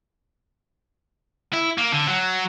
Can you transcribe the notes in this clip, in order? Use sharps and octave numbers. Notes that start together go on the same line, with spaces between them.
E4
A#3
D3
F#3